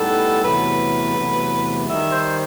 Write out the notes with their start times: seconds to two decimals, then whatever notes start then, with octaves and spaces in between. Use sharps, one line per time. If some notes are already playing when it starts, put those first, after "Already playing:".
Already playing: A2 G3 B3 D#4 A4
0.43 E2 C3 F#3 A3 B4
1.15 E2 C3 F#3 A3
1.87 D#3 G3 D#4 E5
2.11 C5